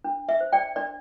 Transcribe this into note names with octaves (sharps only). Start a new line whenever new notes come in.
D4
E5
C5
D5 G5
D4 D5